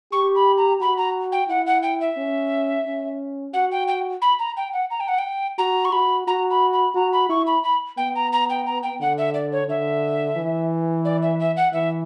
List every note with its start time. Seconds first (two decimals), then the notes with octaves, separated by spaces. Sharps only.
0.12 G4 C#6
0.35 B5
0.58 A#5
0.81 F#4 B5
0.98 A#5
1.32 G5
1.49 E4 F#5
1.66 F#5
1.83 G5
2.01 E5
2.17 C#4
2.86 C#4
3.53 F#4 F#5
3.72 G5
3.88 G5
4.22 B5
4.39 A#5
4.57 G5
4.73 F#5
4.91 A#5
5.00 G5
5.08 F#5
5.18 G5
5.58 F#4 A#5
5.85 C#6
5.92 F#4 B5
6.27 F#4 A#5
6.51 B5
6.73 B5
6.95 F#4 A#5
7.13 B5
7.29 E4 C#6
7.47 B5
7.63 B5
7.97 B3 G5
8.16 A#5
8.33 A#5
8.50 G5
8.66 A#5
8.83 G5
9.00 D3 F#5
9.18 E5
9.34 D5
9.52 C#5
9.68 D3 E5
10.36 E3
11.05 D5
11.23 E5
11.40 E5
11.57 F#5
11.73 E3 E5